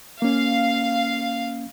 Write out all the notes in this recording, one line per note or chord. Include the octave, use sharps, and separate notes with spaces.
A#3 C#4 F5